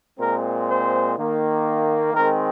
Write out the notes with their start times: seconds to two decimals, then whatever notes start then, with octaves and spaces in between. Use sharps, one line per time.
0.18 A#2 G#3 C4 A#4
0.68 C5
1.16 D#3 A#3
2.13 D#3 G#3 C4 A#4